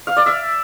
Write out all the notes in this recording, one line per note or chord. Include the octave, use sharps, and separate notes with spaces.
F5
D5
E5